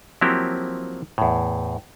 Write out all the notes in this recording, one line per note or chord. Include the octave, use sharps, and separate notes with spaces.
F3 F#3 A#3 C4 E4 G4
E2 A2